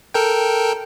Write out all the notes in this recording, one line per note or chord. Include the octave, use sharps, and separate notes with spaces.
A4 A#4 G5